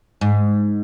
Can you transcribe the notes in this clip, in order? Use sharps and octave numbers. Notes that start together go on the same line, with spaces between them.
G#2